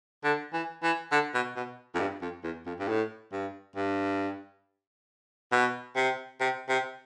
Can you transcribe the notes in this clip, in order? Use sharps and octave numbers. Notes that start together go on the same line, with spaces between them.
D3
E3
E3
D3
B2
B2
F2
G2
F2
E2
F2
G2
A2
G2
G2
B2
C3
C3
C3